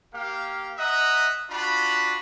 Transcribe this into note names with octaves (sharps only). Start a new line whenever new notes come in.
A#3 G4 F5
D#5 E5 F#5 A#5 D#6
D4 F4 F#4 B5